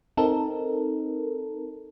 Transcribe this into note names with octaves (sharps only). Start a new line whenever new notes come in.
C4 D#4 A4 A#4